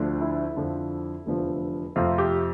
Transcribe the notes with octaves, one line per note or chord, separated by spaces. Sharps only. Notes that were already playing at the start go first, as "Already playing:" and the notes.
Already playing: D2 D3 F3
E4
F2 D3 F3 C4
F1 E2 D3 F3
F2 C3 F3 A3 C4 F4
G4